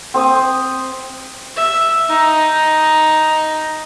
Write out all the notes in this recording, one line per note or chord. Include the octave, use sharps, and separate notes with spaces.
C4 C5 D#6
E5
D#4